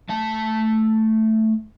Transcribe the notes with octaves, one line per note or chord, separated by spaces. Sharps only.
A3 A5